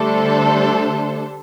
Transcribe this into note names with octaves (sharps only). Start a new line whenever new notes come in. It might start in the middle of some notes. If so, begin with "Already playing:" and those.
Already playing: D3 G3 A3 D4 A4 C5